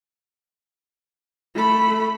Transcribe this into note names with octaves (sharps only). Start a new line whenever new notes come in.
A3 B5